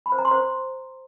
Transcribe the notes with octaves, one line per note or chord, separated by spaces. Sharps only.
B5
C5
A#5
C6
C5